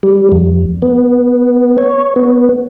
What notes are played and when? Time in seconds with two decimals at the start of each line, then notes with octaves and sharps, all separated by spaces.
0.03 G3
0.32 F2
0.82 B3
1.78 C#5
2.16 B3